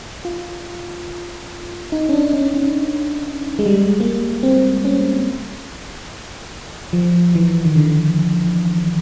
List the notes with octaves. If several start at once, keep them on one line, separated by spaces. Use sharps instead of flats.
F4
D#4
C#4
D4
C#4
C#4
G#3
G3
G#3
A#3
C4
C#4
F3
E3
D#3
D3